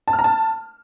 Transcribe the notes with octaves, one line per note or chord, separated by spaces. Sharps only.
A5
F6
A#5
A5